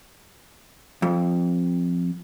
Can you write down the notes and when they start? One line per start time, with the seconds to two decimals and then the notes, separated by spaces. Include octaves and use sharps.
1.02 F2